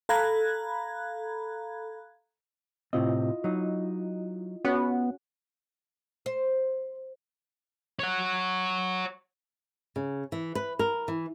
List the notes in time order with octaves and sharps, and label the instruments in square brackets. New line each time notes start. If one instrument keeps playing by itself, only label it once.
[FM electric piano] A4 F5 A#5 B5 F#6 G#6
[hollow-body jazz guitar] A2 C3 C4 [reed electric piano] E4 F4 D#5
[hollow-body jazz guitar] F#3 D#4
[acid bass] B3 [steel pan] C#4 F#4 F#5
[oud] C5
[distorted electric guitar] C#5 F#5
[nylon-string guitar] C#3
E3
B4
A#4
E3